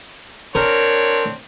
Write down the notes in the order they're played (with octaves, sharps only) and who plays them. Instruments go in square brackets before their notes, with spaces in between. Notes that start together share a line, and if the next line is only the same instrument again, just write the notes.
[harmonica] C4 D4 C#5 [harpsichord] A#4